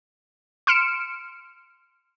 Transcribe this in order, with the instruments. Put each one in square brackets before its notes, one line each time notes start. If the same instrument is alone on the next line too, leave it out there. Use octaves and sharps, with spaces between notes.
[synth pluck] C6 F6 C#7 D7 E7